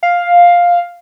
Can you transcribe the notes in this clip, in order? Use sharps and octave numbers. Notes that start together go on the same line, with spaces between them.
F5